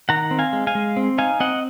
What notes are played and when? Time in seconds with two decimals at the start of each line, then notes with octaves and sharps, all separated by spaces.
0.09 D#3 F#5 A#5
0.31 C4
0.39 F5 G#5
0.53 G#3
0.67 F5 G#5
0.75 G#3
0.97 C4
1.18 D#4 F5 G#5
1.40 C4 D#5 F#5